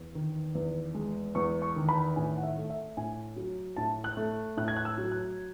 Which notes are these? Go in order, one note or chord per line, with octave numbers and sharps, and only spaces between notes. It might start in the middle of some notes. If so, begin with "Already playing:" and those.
Already playing: E2
D#3
E2
G#3
E2 C#6
C#6
D#3
B5
A2 G#5
F#5
E5
A3
E5
A2 G#5
F#3
A2 A5
F#6
A3
A2 F#6
G#6
F#6
E6
F#3
F#6